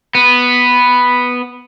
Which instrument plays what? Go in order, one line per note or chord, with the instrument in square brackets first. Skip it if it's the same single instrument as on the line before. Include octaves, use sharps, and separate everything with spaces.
[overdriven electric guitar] B3